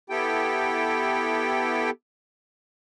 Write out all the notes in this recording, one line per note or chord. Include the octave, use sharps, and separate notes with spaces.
B3 E4 G4 A4 G5